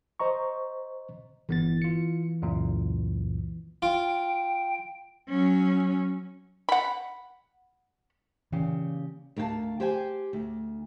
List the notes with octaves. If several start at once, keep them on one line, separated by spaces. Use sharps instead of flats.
C5 D#5 A#5 C#6
G1 E3 B3 A6
F4 C#7
C#2 F#2 A#2
F4 G5
F#3 C#4
F#5 B5
A#2 C#3 E3 G4
D2 A#4 F5 G5 A5
G4 G#4 C5 G5 G#5
D2